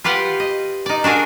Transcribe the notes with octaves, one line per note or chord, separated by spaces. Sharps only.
F4 G4 B4 F5 F#5
D#5
D#4 D5
D4 F#4 G#4 A#4